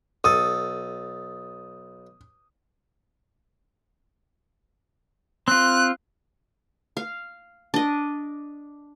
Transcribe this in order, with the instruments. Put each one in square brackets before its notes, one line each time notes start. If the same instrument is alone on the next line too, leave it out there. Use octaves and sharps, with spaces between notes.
[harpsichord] B1 A4 [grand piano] D#6
[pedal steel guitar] C4 F4 [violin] F#6
[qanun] F5
D4 D#5